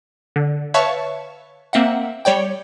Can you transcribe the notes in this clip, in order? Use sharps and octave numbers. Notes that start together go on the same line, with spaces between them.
D3
B4 C#5 E5 F5 A5 C#6
A#3 C4 E5 F#5
G3 C#5 D5 G5